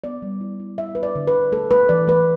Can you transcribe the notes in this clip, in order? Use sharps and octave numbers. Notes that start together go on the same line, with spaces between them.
B3 D5
G3
E4
E4
E4 E5
B3 B4
D5
D3
B4
D3
A3 A4
A3 B4
E3 D5
A3 B4